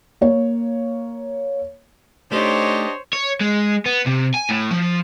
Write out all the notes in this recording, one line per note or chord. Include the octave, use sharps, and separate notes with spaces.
A#3 C#5
A3 D4 D#4 G4 C5 C#5 D#5
C#5
G#3
B3
C3
G#5
A2
F3